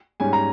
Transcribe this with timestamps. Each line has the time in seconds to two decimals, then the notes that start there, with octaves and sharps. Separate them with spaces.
0.20 G#2 G3 C#4 G#5
0.33 A#5